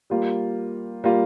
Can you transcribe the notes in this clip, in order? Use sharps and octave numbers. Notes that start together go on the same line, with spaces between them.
G3 A#3 F4
G3 A#3 F4